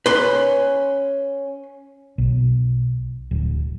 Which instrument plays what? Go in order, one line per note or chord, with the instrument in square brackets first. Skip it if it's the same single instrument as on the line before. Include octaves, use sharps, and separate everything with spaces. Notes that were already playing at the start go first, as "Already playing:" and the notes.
[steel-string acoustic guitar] C#4 [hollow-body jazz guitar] B4 C6
[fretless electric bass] B1
D1